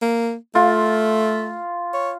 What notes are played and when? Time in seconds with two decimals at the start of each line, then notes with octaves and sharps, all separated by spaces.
0.02 A#3
0.55 A3 F4
1.94 C#5